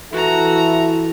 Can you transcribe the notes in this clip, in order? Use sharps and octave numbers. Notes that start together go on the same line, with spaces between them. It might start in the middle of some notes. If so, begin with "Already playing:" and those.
E3 E4 F#4 A4 A#5